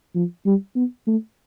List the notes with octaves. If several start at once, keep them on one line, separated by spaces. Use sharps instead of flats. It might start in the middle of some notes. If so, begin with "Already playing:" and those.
F3
G3
B3
A3